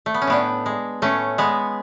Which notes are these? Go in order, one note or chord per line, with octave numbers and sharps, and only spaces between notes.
A3
B3
C#4
A2 B3 D4
G#3
A2 A3 C#4
G#3 B3